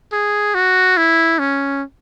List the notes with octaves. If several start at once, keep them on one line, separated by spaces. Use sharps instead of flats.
G#4
F#4
E4
C#4